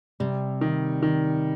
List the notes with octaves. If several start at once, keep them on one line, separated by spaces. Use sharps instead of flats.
C3 G3
D#3
D#3